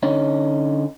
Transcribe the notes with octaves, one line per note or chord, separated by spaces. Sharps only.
D3 C#4 D#4